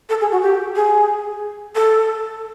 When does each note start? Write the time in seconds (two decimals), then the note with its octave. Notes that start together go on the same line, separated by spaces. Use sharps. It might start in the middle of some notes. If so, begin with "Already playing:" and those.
0.09 A4
0.21 G#4
0.32 F#4
0.42 G4
0.75 G#4
1.75 A4